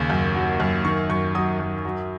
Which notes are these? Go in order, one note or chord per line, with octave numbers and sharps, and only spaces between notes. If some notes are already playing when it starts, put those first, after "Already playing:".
Already playing: D#2 C#3
F#2
F#3
F#2
D#3 C#6
F#2 C#6
F#3 D#6
F#2
F#3